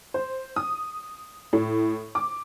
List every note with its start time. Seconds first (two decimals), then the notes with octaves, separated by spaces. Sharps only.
0.14 C5
0.56 D#6
1.53 A2
2.15 D6